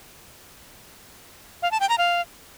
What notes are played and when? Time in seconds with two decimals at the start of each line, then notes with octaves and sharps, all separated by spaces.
1.62 F5
1.71 A5
1.80 G5
1.89 A#5
1.98 F5